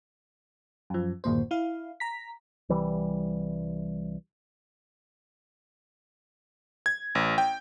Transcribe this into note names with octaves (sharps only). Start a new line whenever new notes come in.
F#2 F3
G1 D#2 A#2 C5
E4 F5
A#5 B6
C2 E3 G3
G#6
A1
G5